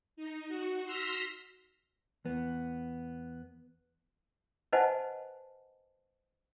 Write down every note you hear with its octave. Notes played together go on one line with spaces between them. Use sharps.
D#4
F#4
C6 E6 F6 A#6 B6
E2 B3
B4 C5 D#5 F#5 G#5 A5